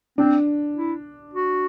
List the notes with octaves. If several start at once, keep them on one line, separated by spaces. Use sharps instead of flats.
C4 D4
E4
F#4